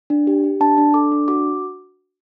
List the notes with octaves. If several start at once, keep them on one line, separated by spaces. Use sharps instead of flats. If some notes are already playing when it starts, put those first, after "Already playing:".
D4
G4
G4
D4 A5
D4
A4 D6
D4
F#4 D6